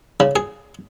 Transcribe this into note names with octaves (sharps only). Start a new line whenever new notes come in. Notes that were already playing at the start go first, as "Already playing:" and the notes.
C#3
G#4